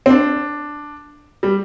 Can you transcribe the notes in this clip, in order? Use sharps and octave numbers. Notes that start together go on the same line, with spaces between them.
C4
D4
G3